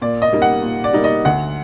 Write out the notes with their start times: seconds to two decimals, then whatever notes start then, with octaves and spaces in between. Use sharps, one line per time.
0.02 A#2 D5
0.22 D#5
0.33 G3 A#3 D#4
0.42 F#5
0.62 A#2
0.84 D5
0.93 G3 A#3 D#4
1.04 D#5
1.25 D2 F#5